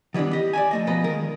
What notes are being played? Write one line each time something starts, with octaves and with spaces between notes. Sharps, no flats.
D#3 E3 G3 B3 D4
G4 D#5
D5 E5 G#5
F2 A3 D#5
E2 B2 F3 B4 D#5 A#5
D#3 G#3 A#4